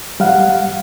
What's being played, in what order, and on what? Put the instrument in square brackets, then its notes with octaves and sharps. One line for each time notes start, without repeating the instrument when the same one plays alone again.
[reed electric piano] G3 F5 F#5